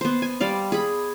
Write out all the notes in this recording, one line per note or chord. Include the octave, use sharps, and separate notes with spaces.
B3 C5
G#5
G3 D5 F5
G#4 B5